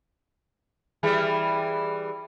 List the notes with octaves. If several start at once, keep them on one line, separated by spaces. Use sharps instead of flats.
E3 G3 G#4